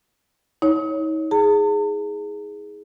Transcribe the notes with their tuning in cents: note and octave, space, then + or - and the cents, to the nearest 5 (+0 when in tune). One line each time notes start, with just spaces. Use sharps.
D#4 +40 C#5 +0
G#4 +0 A5 +45